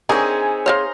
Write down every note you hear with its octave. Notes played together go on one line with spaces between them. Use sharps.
D3 C4 D#4 G#4 A#4 C#5 E5 G#5
A#4 C5 C#5 F5 A#5 C6